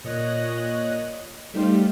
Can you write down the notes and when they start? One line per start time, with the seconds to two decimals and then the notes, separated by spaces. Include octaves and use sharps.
0.04 A#2 C#5 D#5 F#6 A#6
1.54 G3 A3 D#4 G4 C5 F5